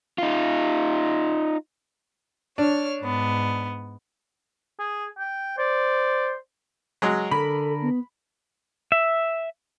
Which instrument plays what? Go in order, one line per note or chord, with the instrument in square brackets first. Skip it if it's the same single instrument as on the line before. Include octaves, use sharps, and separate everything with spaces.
[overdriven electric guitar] D#4 F4
[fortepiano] D4 [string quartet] C#5 F6
[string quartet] G#2 B3
[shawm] G#4
G5
[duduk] C5 [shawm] D5
[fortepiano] F#3 G#3
[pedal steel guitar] D3 A#4 [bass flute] A4 [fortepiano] B5
[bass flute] B3
[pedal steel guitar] E5